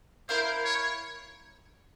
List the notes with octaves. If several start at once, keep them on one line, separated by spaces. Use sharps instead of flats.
E4 A#4 C5 F5
C#5